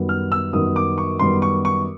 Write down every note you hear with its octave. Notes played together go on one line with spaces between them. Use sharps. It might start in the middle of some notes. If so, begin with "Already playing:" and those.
Already playing: F#2 D#3 G3 B3
F6
E6
F#2 D#3 G3 B3 D#6
D6
C#6
F#2 D#3 G3 B3 C6
C#6
C#6